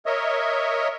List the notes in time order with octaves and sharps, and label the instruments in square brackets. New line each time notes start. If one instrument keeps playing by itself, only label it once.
[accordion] A#4 C#5 D#5 E5